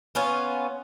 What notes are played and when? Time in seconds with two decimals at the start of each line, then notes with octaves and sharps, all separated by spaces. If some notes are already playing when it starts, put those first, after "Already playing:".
0.15 B3 C#4 F4